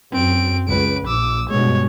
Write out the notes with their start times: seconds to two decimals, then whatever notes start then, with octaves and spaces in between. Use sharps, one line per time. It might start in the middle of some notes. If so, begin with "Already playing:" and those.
0.12 F#2 C4 D7
0.68 C#2 B4 D7
1.07 A#1 D6 E6
1.50 G2 B2 G#3 C#5